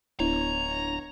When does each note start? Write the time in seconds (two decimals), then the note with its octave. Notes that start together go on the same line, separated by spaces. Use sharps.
0.20 D1 B3 D4 E4 C#5 A#5